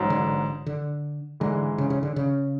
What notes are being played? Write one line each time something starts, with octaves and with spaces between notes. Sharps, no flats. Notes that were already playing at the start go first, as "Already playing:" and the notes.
Already playing: A1 G#2 F#3
D3
D3
G#2 D3 E3 G#3
C#3
C#3
D3
C#3